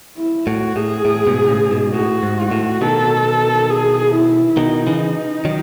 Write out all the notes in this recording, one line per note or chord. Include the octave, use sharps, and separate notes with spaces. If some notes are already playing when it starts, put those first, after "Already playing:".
E4
A2 F#4
A2 G#4
A2
G#2 B2
A2 C#3
G#2 B2
A2 F#4
G#2
F#4
A2
B2 D#3 A4
G#4
E4
B2 D#3 D#4
C#3 E3
D#3 F#3